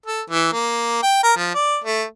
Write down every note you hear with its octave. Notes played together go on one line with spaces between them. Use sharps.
A4
E3
A#3
G5
A#4
F3
D5
A3